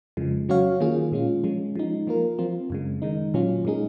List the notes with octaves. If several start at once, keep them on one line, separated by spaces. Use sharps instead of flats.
F2 C#3 F3 G#3
F#3 C#4 F#4 C#5 F5
D#3 A#3 F4 G#4
A#2 G#3 C#4 F4
F3 G#3 C#4
F3 G#3 D#4
F3 A#3 F4 A#4
F3 C4 F4
F#2 C#3 G#3
D#3 G#3 D#4
A#2 F#3 C#4 F4
A#2 G#3 D#4 G#4